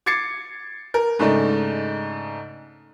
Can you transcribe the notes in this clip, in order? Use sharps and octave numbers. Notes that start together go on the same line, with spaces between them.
D6 G#6 A6 C7 C#7
A#4
G#2 C#3 A3 D4 D#4